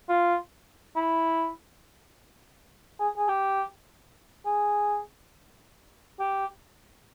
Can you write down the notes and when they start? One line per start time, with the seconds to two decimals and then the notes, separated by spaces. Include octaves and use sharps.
0.09 F4
0.96 E4
2.99 G#4
3.17 G#4
3.29 G4
4.46 G#4
6.20 G4